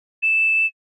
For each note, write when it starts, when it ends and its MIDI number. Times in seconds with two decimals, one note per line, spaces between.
0.23 0.66 100